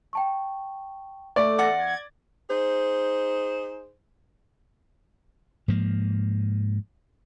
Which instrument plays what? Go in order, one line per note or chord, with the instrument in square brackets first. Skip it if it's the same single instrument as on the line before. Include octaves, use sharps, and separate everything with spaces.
[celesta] G5 A5 C#6
[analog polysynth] A3 [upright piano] D5 [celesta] C#6
[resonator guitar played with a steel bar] E2 F#5 [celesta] D6 A6 A#6
[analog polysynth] G#6
[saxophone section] D#4 G#4 C5
[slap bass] G#2 F3 A#3